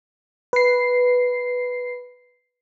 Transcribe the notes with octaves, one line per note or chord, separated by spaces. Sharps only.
B4 C7